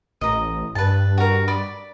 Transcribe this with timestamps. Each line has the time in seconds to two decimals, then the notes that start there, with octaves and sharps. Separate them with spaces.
0.21 A1 D#5 A#5
0.75 G2 B4 A5
1.18 F#4 A#4
1.48 D5 B5 D6